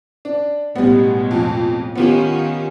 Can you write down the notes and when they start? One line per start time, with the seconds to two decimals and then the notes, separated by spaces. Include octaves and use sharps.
0.25 D4
0.76 A1 B2 G3 G#3 B3
1.31 F2
1.95 D#3 B3 C#4 F4 G4